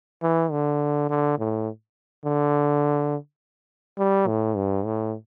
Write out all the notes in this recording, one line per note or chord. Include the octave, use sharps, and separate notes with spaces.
E3
D3
D3
A2
D3
G3
A2
G2
A2